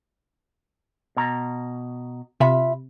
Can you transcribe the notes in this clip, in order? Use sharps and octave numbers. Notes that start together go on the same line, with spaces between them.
B2 A#5
C3 F4 E5 B5